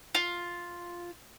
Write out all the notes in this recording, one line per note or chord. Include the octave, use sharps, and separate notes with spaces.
F4